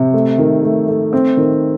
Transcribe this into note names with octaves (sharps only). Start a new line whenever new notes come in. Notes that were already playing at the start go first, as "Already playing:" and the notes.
Already playing: C3
A3
D#3
A3
A3
C4
D#3